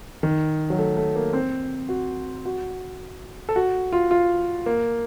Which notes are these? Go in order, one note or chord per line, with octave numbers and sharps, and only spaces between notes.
D#3
F#3
A3
A3
A#3
C4
F#4
F#4
A4
F#4
F4
F4
A#3